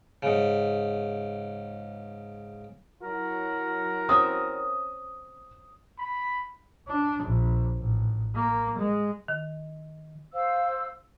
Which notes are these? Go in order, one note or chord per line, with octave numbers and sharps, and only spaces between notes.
G#2 C#3
F#3 E4 F#4 A#4
C4 C#4 E5 D#6
B5
D4
A#1
A1
A#3
G#3
D#3
C5 F5 E6